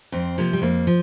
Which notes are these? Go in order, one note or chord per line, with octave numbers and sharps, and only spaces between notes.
F2 C4
C3 F3 A#3
G3
F2 A#3
F3